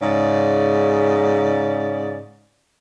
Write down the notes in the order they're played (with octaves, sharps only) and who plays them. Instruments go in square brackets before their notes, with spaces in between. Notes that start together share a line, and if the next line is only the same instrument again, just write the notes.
[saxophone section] G#2 C#3 D5